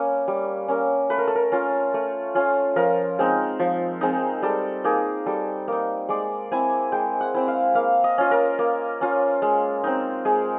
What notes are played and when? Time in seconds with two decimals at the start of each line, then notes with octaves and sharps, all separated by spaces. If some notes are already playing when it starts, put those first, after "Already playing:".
Already playing: A#3 C#4 B4
0.28 G3
0.68 A#3 C#4
1.10 A3 B4
1.18 A#4
1.27 A4
1.35 A#4
1.52 C#4 F4
1.94 A3
2.35 C#4 F4
2.76 F3 A#4
3.19 G#3 C4 D#4
3.59 F3
4.01 G#3 C4 D#4
4.42 G3 A4
4.84 A#3 D#4 G#4
5.26 G3 A4
5.68 A#3 D#4
6.09 G#3 D5
6.51 C4 E4 G#5
6.92 G#3 G5
7.21 F#5
7.34 C4 E4
7.48 F5
7.75 A#3 F5
8.04 D#5
8.18 C#4 F4
8.31 A#4
8.59 A#3
9.01 C#4 F4
9.42 G#3
9.84 C4 D#4
10.25 G#3 G#4